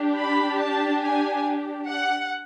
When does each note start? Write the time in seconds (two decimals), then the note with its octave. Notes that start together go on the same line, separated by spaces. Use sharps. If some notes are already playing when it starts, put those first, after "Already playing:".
Already playing: D4 G4
0.17 B5
0.61 A5
1.03 G#5
1.88 F#5